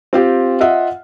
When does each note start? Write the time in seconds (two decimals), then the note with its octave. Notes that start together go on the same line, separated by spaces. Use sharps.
0.13 C4 F4 G4
0.61 F4 D#5 E5 F#5